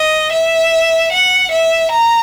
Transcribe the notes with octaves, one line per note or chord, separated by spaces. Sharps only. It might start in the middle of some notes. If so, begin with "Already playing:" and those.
Already playing: D#5
E5
F#5
E5
A#5